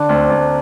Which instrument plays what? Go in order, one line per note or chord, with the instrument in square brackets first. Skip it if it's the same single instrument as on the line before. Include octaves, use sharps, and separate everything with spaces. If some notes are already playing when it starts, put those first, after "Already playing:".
Already playing: [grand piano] D3 [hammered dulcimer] D4
[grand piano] D2 [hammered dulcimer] C4
[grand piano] D2 [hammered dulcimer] A#3